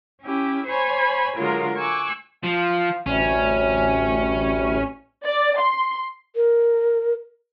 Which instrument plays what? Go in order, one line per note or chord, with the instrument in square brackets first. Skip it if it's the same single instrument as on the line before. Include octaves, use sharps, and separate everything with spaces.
[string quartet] C#4 E4 G4
C5 C#5 G#5 B5
D3 F#3 G#3 F4 A#4
G#5 C#6 D6 E6 F#6
[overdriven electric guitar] F3 [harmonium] F5
[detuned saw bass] A1 [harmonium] D2 C3 G3 [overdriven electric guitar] C#4
[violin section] D5
C6
[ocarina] A#4